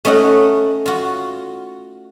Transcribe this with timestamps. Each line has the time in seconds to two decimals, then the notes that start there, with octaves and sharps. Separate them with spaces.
0.05 A3 C#4 D#4 D#5 F#5
0.86 F4 F#4